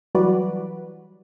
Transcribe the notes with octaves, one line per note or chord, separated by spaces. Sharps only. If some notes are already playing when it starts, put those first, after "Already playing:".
E3 F#3 G3 F#4 B4 D5